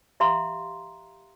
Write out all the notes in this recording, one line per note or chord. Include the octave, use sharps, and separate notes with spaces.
G4 E5 F5 A#5 C6